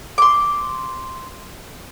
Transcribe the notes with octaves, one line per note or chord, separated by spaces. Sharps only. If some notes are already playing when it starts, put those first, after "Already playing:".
C6 D6